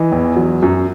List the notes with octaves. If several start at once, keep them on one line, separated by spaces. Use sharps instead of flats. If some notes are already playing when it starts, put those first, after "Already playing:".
Already playing: E3 D#5
E2
F#3
F#2